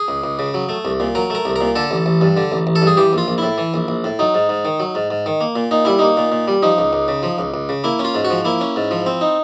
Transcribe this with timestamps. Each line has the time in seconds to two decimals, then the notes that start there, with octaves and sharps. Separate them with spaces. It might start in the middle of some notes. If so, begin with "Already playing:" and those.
Already playing: G#4
0.08 C#2
0.24 C#2
0.39 C#3
0.54 F#3
0.69 A3
0.85 C2
1.00 A#2
1.15 F#3 A#4
1.30 A3 A#4
1.45 C2
1.56 A#4
1.61 A#2
1.76 D3 A4
1.91 A1
2.06 A1
2.21 G2
2.37 D3
2.52 A1
2.67 A1
2.75 A4
2.82 G2 G#4
2.97 E3 G4
3.13 A#1 F4
3.28 A#1
3.38 A2 E4
3.58 E3
3.74 A#1
3.88 A#1
4.04 A2
4.19 F#3 D#4
4.34 G#2
4.49 G#2
4.65 D#3
4.80 F#3
4.95 G#2
5.10 G#2
5.26 D#3
5.41 A#3
5.56 A#2
5.71 A#2 D#4
5.85 G3 E4
5.99 A#3 D#4
6.17 A#2
6.32 A#2
6.48 G3
6.63 F3 D#4
6.78 C#2
6.93 C#2
7.08 C#3
7.23 F3
7.38 C#2
7.54 C#2
7.69 C#3
7.84 A#3 E4
7.99 C#4
8.05 F4
8.15 G#2
8.24 F#4
8.30 F3
8.45 A#3 E4
8.61 C#4
8.76 G#2
8.91 F3
9.06 C4
9.21 D#4